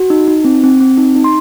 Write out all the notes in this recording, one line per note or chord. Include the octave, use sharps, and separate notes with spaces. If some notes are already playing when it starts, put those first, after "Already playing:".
Already playing: F#4
D#4
D#4
C4
C4
C4
D#4
D#4
C6